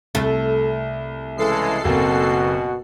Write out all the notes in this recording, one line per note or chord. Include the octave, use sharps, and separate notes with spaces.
C2 A3
C#3 E3 G#3 A4 C7
F#1 B2 A#3 C4 F#4